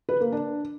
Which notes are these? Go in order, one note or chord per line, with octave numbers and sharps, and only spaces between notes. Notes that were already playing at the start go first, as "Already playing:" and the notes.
B4
A#3
D4